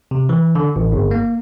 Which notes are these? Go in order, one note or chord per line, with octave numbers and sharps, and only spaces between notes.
C3
E3
D3
A1
G1
A#3